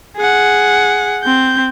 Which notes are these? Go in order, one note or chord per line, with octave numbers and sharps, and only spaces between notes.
G#4 F#5
C4 G6